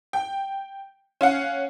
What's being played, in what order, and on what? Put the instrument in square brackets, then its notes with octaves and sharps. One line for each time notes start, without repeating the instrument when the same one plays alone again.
[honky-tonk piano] G5
C#4 F5 F#5